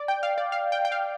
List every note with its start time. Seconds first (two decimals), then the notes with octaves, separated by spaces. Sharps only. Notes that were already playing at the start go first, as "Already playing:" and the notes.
Already playing: D5
0.08 G5
0.23 F5
0.38 D5
0.52 F5
0.72 G5
0.85 G5
0.92 F5